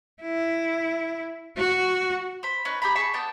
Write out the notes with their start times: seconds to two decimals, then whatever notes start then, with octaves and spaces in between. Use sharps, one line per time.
0.22 E4
1.57 F#4
2.43 C5 B5
2.65 C#4 D#4 B4
2.82 G4 G#4 A#5 B5
2.96 G#4 A5 B5 C#6
3.14 B3 D4 G5 A5